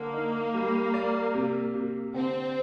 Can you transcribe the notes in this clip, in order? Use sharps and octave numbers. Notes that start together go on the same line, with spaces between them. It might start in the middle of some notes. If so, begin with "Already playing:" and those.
Already playing: D3 A#3
D#4
G3
D5
C3
C3
D3 C4